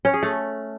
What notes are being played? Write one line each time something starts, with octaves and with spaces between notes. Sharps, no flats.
C#4
G#4
A3